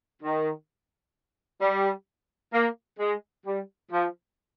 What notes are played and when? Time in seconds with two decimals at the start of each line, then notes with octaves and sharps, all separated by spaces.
0.22 D#3
1.62 G3
2.54 A#3
2.99 G#3
3.46 G3
3.92 F3